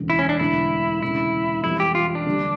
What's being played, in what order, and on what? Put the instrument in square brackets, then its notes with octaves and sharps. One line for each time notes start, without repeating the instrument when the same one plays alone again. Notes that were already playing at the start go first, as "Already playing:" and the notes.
Already playing: [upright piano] E1 D2 C#3 E3
[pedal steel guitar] E4
C#4
D4
[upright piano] E1 D2 D3 [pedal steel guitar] E4
[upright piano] E1 D2 C#3 [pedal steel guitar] E4
[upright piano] F2 E3 G3 [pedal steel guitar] E4
[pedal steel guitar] G4
F4
D4
[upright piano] D2 D3 G3